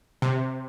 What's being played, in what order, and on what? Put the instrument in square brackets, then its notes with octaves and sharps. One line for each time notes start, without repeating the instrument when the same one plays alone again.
[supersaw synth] C3